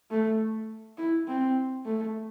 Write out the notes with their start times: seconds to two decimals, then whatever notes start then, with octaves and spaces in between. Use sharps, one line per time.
0.11 A3
0.97 E4
1.28 C4
1.86 A3